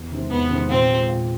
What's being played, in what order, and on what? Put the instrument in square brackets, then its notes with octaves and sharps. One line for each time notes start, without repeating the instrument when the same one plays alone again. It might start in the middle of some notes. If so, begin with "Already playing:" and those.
Already playing: [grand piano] E2
C3 D#3 G#3 C4
[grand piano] E2 [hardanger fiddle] B3
[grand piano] C3 D#3 G#3 C4
[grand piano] A#2 [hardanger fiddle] C4
[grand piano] F3 G#3
A#2